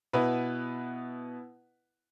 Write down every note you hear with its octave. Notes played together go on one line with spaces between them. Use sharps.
B2 B3 E4 B4